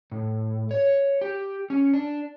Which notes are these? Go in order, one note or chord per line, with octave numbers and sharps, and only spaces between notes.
A2
C#5
G4
C#4
D4